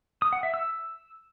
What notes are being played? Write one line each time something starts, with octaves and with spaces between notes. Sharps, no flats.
D#6
F#5
E5
E6